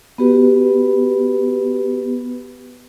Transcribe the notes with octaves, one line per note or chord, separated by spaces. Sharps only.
B3 F#4 G4 B4